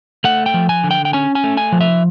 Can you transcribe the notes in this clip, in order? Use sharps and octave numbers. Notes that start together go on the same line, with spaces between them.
A3 F#5
G5
F3
G#5
D3
G5
G5
C#4 G#5
G#5
A3
G#5
F3
E5